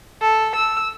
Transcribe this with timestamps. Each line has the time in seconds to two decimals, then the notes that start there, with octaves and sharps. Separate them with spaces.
0.22 A4
0.56 E6